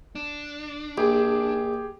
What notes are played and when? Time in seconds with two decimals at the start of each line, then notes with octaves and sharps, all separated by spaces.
0.15 D4
0.98 A#1 G4 G#4